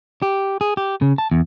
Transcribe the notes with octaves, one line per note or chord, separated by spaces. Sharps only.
G4
G#4
G4
C#3
A5
E2